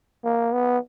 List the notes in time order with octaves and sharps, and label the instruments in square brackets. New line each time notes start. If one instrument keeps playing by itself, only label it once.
[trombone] A#3
B3